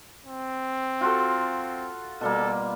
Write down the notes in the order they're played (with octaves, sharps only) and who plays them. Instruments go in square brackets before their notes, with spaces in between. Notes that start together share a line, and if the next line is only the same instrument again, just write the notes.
[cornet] C4
[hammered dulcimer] F4 F#4 A4
[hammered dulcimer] B2 G3 A#3 [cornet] A4